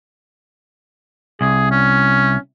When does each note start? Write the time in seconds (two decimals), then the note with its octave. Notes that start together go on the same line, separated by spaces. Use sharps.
1.41 C2 G#4
1.71 C#4